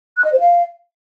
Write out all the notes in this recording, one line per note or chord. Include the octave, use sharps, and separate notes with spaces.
F#6
D#5
C5
F5